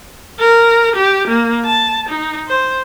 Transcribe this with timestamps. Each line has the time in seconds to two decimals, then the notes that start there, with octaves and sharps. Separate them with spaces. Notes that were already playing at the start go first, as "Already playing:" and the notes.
0.39 A#4
0.95 G4
1.27 A#3
1.65 A5
2.09 D#4
2.48 C5